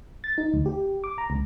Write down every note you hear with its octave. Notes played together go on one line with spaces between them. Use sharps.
A6
D#4
D2
G4
D6
A#5
C#2